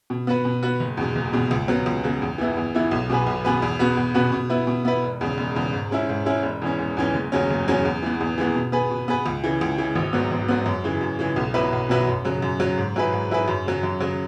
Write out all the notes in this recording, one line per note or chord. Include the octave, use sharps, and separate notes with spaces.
B2
B3 F#4 B4
B2
B3 F#4 B4
F#1
E2 B2 G#3
F#1
E2 B2 G#3
C#2
C#3 F#3 B3
C#2
C#3 F#3 B3
E2
E3 B3 E4
E2
E3 B3 E4
B1
B2 B3 G#4 B4
B1
B2 B3 G#4 B4
E2
B2 B3 F#4 B4
E2
B2 B3 F#4 B4
B2
B3 E4 B4
B2
B3 E4 B4
E1
E2 C#3
E1
E2 C#3
G#2
G#3 C#4 E4
G#2
G#3 C#4 E4
E1
E2 E3 C#4
E1
E2 E3 C#4
F#1
E2 C#3 F#3 C#4
F#1
E2 C#3 F#3 C#4
E2
E3 G#3 B3
E2
E3 G#3 B3
B2
B3 G#4 B4
B2
B3 G#4 B4
C#2
C#3 E3
C#2
C#3 E3
G#1
G#2 F#3 B3
G#1
G#2 F#3 B3
F#2
C#3 E3 G#3
F#2
C#3 E3 G#3
B1
B2 F#3 E4 B4
B1
B2 F#3 E4 B4
F#2
C#3 F#3
F#2
C#3 F#3
G#2
F#3 E4 G#4 B4
G#2
F#3 E4 G#4 B4
F#2
C#3 F#3
F#2
C#3 F#3